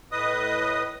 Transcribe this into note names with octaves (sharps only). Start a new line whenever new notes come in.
A2 B4 D#5 D#6